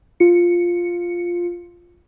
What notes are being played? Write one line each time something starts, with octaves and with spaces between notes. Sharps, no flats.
F4 C#7